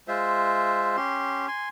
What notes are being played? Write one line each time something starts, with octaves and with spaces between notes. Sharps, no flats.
G#3 F4 C5 E5
C#4 G4 C6
G#5 C6